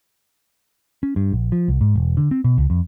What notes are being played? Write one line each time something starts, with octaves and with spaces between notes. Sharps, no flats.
C#4
G2
A#1
F3
C2
G#2
E1
D3
C4
B2
C#2
F2